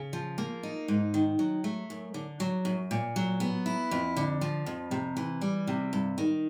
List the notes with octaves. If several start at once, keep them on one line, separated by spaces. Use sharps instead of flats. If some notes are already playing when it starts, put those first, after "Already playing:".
Already playing: C#3
F3
A#3
D#4
G#2
D#3
F#3
A3
F#2
D3
F#3
F#2
A#2
F#3
B3
E4
F2
D3
F3
F2
C3
E3
G3
C3
G2
D#3